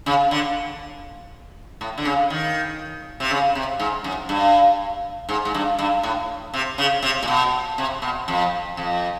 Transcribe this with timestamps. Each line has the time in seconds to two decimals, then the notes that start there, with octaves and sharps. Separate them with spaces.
0.06 C#3
0.31 D3
1.81 A2
1.98 D3
2.05 C#3
2.30 D#3
3.20 C3
3.31 C#3
3.55 C3
3.80 G#2
4.04 F#2
4.29 G2
5.29 G#2
5.45 G#2
5.54 G2
5.79 G2
6.03 A2
6.54 C3
6.78 C#3
7.02 C3
7.23 A#2
7.28 B2
7.78 C3
8.02 B2
8.28 F2
8.77 F2